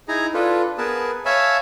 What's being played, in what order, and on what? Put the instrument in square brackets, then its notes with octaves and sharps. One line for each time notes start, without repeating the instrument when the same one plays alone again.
[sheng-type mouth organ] D#4 E4 G#4 G#5 A#5
D4 F4 A4 B4
B3 G#4 A#4 B4 A5
C#5 E5 F5 G#5 A5 B5